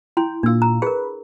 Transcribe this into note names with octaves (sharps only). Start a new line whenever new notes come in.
E4 G5 C6
A#2 D4 F4 E6
A#5
G#4 A#4 B4